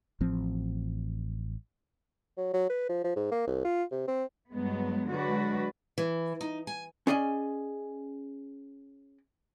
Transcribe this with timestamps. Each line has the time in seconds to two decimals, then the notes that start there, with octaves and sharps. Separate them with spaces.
0.21 A1 F3 C4
2.37 F#3
2.53 F#3
2.70 B4
2.89 F3
3.04 F3
3.16 G#2
3.31 A#3
3.47 C2
3.64 F4
3.92 C3
4.08 C4
4.54 G2 F#3 G#3 B3
5.09 D3 F#3 G#3 F#4 B4 D5
5.98 E3
6.41 D#4
6.67 G#5
7.07 C#4 G#4 D5 D#5 F5 G#5